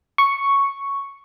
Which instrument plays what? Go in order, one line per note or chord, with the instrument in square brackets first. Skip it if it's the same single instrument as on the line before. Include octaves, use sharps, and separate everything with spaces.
[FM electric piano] C#6